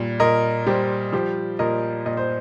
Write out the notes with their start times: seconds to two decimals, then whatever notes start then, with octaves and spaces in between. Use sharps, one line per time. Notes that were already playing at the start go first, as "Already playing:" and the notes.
Already playing: A#2 G3
0.20 A#2 A#4 D#5
0.66 G3 G4 C5
1.13 F3 G4 C5
1.59 A#2 A#4 D#5
2.06 A#2 D#5
2.17 C5